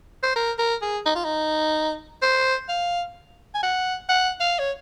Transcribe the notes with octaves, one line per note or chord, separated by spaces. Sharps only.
C5
A#4
A#4
G#4
D#4
F4
D#4
C5
F5
G#5
F#5
F#5
F5
C#5